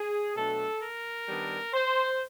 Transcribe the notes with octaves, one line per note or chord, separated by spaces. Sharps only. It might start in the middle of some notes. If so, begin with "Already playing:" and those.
Already playing: G#4
B2 F#3 A3 D4 A4
A#4
D#3 G3 B3 D4
C5